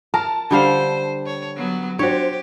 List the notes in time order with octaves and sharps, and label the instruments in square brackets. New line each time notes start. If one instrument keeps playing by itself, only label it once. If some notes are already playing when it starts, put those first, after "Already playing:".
[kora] A#4 [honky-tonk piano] A5
[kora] D3 G3 F5 [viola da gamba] C5
[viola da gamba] C#5
F#3 B3
[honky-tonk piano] D4 C5 [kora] F#4 C#5 [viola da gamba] G4